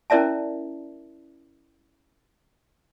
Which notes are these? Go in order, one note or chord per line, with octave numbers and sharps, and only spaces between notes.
C#4 E4 A#4 D5 E5 A5